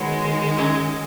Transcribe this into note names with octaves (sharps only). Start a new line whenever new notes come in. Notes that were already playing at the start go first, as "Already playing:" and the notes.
Already playing: D#3 F#3 G#3 B3 F#4 C#5
F#2 F#3 C#4 G#4 D#5